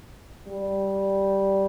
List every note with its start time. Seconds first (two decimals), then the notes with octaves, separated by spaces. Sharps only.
0.48 G3